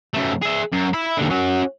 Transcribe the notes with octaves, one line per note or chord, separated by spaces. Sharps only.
F#2 A3
G#4 E5
F#2
E5 B5
D#2 D3
C#4 F#4